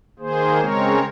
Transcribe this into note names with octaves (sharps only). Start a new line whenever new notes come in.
D#3 A#3 G#4 C5
C#3 G#3 C4 A#4 C#5